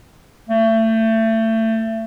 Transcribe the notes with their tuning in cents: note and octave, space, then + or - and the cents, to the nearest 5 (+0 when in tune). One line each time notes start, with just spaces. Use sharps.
A3 +25